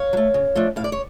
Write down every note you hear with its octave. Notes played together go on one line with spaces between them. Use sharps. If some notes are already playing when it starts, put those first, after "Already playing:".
Already playing: C#5 F5
F#3
A3
C#3
F3 A3 D4
A2 F5
D5
C#5